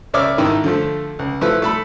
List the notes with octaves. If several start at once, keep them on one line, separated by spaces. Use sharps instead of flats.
C#2 C#5 D5 E5 D6 F6
G#1 D#3 E4
D3 F3 A3
C#2
F3 A3 E4 B4
A3 A4 B5